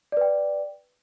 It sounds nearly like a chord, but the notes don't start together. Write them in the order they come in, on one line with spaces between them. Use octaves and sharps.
D5 B4 G5